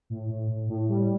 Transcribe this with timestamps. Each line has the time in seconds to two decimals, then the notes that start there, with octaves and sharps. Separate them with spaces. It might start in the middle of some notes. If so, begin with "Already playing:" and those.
0.10 A2
0.30 A2
0.50 A2
0.69 A2
0.89 G3